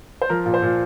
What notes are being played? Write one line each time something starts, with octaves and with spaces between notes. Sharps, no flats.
C5
F3 A#4
A#2
C5
A#2